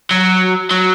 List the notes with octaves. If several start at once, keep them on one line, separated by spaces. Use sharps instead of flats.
F#3
F#3